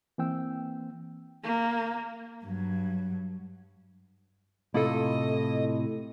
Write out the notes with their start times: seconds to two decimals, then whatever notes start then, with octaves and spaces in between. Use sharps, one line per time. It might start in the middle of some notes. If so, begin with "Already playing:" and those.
0.18 E3 A#3 C4 G5 E6
1.43 A#3
2.45 G2 F#3
4.74 A2 C3 E4 F4 A4 D#5